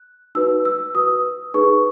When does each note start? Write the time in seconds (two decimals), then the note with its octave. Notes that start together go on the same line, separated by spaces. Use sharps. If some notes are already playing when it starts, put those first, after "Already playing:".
Already playing: F#6
0.35 D#4 F#4 B4 E6
0.65 E6
0.95 F#4 B4 D#6
1.54 D#4 G#4 B4 C#6